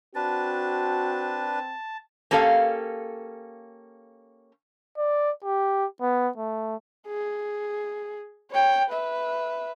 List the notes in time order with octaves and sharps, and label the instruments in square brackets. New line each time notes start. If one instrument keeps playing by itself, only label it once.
[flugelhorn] C4 [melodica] D4 B4 [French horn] F#4 [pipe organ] A5
[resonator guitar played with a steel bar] A#3 C#4 G4 A4 C#5 F5
[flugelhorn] D5
G4
B3
A3
[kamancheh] G#4
C#5 G5
B4 E5